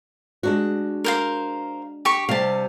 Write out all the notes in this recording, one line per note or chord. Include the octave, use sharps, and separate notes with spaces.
G#3 D4 F#4
A#4 C5 F5
G4 C#6
C3 G3 C4 F5 A5